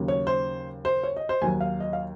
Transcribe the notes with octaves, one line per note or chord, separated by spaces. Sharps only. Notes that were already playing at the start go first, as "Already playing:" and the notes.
Already playing: D#2 C#3 F#3
C#5
C5
C5
C#5
D#5
C5
D#2 D#3 F#3 G#5
F5
D#5
F5